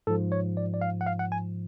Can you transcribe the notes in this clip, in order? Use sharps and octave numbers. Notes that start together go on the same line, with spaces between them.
G#2 F3 A4
C#5
D5
D5
F5
F#5
F5
F#5
G#5